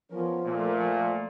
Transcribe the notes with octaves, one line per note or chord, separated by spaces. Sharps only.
F3 B3 C#4 A#4
A#2 A3